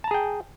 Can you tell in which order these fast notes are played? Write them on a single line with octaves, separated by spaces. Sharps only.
A5 A#5 G#4 G5